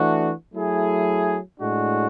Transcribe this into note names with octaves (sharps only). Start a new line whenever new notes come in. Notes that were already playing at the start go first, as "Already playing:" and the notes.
Already playing: E3 A3 D4 F#4
F#3 A3 E4 G#4
A2 G#3 D4 F#4